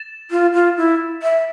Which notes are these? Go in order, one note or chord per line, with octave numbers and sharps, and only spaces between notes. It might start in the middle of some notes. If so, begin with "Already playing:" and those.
Already playing: A6 E7
F4
F4
E4
E5